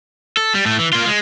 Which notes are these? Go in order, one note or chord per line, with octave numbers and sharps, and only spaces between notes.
A4
G3
A2 A3
E3
A#3 F4
G#3